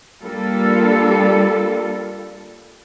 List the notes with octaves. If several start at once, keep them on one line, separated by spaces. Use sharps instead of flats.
G3 A#3 D4 F4 A4